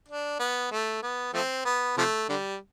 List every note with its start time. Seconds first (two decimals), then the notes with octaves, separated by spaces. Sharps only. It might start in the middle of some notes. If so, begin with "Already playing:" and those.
0.08 D4
0.39 B3
0.71 A3
1.03 B3
1.34 F3 A3 C4
1.65 B3
1.98 C3 F3 A3
2.29 D3 G3